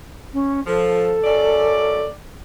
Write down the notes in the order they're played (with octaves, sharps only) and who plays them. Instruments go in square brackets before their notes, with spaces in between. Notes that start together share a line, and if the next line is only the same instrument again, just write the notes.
[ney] C#4
[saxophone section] F3 [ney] A4
[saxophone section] F#2 C#4 D5